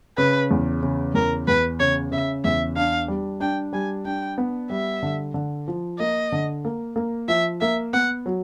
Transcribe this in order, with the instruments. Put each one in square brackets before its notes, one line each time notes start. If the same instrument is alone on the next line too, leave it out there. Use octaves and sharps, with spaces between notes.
[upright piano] C#3 [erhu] B4
[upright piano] E2
C#3
[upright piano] E2 [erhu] A#4
[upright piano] E2 [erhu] B4
[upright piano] C#3 [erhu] C#5
[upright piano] C#3 [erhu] E5
[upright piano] E2 [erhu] E5
[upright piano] D4 [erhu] F5
[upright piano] G3
[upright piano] D4 [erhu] G5
[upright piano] G3 [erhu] G#5
[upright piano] D4 [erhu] G5
[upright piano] B3
[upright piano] G3 [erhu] E5
[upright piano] D3
D3
F3
[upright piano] A#3 [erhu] D#5
[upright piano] D3
A#3
A#3
[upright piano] F3 [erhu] E5
[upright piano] A#3 [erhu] E5
[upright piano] B3 [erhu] F#5
[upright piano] F#3